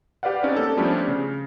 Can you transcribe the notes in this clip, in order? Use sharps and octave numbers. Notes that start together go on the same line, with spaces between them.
G4 B4 D5 F5 F#5
C4 C#4 D#4 G4 B4 D5
A#3 A4
F3 G3 A3 B3 C#4 D4
C#3